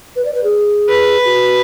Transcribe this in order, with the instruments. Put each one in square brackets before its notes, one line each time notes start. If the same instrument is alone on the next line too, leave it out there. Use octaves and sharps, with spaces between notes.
[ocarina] B4
D5
B4
G#4
[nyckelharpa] B4
[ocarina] F#4